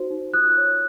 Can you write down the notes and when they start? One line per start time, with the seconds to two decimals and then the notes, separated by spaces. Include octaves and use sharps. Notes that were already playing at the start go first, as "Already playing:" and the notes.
Already playing: D#4 F#4 C5
0.10 D#4
0.33 F4 D#6 F#6
0.57 C#5